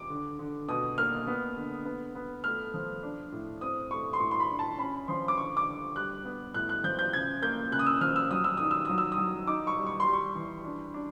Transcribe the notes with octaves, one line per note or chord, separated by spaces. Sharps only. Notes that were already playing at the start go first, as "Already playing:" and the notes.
Already playing: D6
D3
D3
B2 D#6
A#3 F6
B3
D3
B3
B3
A3 F6
F3
D4
A2
C4 D#6
A3 C#6
C6
A2 C#6
C6
B5
D4
A5
C#4 B5
F3 C6
D6
D3 C#6
D6
D3
G3 F#6
B3
A2 F#6
F#6
F3 G6
G6
C#3 G#6
A#3 G6
C#3 F#6
D#6
E6
F3 F6
E6
F#3 D#6
E6
D#3 D#6
E6
F#3 D#6
E6
D#6
F#3
D#4 D6
C#6
G3
C#6
C6
G3
C#6
E3
D4
D4